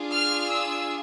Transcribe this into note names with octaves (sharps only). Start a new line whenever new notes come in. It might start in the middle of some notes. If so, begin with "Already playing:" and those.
Already playing: D4 F4 G#4
F6
E6